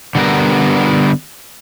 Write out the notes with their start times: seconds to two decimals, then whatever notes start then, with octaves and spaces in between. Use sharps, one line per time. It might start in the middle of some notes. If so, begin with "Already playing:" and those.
0.15 D3 G3 B3 A#4